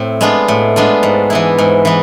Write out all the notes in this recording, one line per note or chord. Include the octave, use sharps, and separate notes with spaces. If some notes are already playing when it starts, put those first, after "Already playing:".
Already playing: A2 C4
G#3 B3 D4 F4
A2
G#3 B3 D4 F4
G#2
E3 B3 E4
G#2
E3 B3